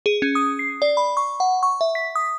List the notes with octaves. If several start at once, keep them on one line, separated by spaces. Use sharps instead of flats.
G#4
C#4
D#6
C7
D5
B5
C#6
F#5
C#6
E5
B6
D#6